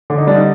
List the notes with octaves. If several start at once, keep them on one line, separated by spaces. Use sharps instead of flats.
D3
D#4
G3 D4
D#4